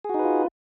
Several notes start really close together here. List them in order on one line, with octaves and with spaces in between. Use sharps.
G#4 F#4 D#4 B4 F4